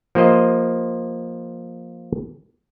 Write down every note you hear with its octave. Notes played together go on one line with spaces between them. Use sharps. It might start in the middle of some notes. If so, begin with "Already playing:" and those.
F3 A#3 G4 C5 D#5